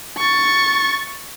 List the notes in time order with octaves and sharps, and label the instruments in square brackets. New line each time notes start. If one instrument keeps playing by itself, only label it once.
[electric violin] C#6 A6